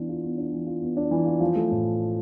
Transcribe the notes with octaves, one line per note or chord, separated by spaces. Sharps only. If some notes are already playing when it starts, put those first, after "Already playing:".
Already playing: E3 B3 D4
F4
B3
D4
E3
F4
B3
D4
E3
F4
F3
A3
A2